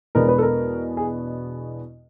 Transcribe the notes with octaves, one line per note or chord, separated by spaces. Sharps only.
E2 B2 G#3 B3 D4 A#4
B4
A4
A#4
G#4